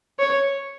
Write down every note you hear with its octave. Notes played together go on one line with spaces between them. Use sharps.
C#5